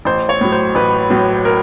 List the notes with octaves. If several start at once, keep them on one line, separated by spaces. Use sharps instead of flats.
A1 C5
C#5
A2 F#3
C5
A1 B4
A2 F#3
A#4